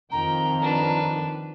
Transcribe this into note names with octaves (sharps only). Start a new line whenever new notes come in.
F2 D#3 G5 A#5
D4 B4